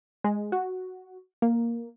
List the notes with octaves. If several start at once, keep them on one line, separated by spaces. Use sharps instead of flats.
G#3
F#4
A#3